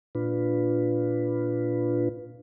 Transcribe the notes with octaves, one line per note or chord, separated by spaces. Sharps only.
A#2 D4 F4 B4